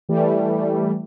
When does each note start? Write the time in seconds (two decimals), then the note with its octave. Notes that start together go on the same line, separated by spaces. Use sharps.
0.09 E3 G3 A3